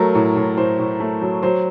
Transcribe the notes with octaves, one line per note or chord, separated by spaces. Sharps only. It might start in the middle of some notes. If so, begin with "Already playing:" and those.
Already playing: F#3 A3 A#4
A2
A2
A2 C5
A2
A3
F#3
F#3 C5